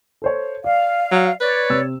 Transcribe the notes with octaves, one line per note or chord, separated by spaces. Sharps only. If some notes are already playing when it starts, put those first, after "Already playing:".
A4 C5 C#5
D5 F5
F#3
B4 C#5 D5
C3 E6